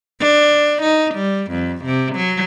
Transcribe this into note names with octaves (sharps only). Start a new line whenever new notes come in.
D4
D#4
G3
F2
C3
F#3